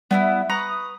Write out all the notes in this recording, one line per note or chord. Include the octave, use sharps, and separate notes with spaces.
G3 B3 D4 E4
B4 A#5 C#6 D#6